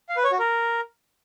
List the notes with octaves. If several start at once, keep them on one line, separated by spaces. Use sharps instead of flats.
F5
B4
C#5
F#4
A#4